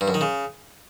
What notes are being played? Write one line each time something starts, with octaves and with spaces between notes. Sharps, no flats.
G2
F#2
D#3
C#3